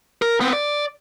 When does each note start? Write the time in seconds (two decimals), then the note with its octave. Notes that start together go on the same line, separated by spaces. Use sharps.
0.22 A#4
0.41 B3 C4
0.53 D5